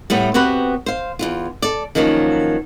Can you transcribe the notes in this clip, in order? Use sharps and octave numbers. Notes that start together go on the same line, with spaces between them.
A2 G3 A3 B3
B3 C4 F#4 G4 B4
C5 F5
E2 G2 F4
A4 D5
D#3 F3 F#3 A#3 C#4